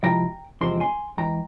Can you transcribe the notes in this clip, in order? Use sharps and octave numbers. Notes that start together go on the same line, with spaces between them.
C3 F3 G#3 E4 G5 A#5
E2 C3 F3 G#3 C4 C6
G#5 C6
E2 E3 G#3 G5 A#5